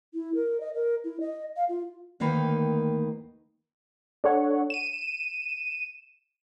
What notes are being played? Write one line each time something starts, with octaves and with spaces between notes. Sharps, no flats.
E4
A#4
D#5
A#4
E4
D#5
F5
F4
D2 D#3 A#3 D#4 B4 G5
D4 A4 C#5 F#5
D#7 E7